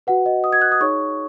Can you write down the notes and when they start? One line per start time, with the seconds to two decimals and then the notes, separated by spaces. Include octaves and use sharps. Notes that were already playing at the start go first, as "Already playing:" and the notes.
0.07 F#4 B4 F#5
0.26 D#5
0.44 D#6
0.53 G#6
0.62 F#6
0.72 D#6
0.80 D#4 G#4 C#5 C#6